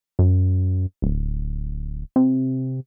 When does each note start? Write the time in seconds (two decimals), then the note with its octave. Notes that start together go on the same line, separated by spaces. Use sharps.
0.19 F#2
1.02 D1
2.16 C3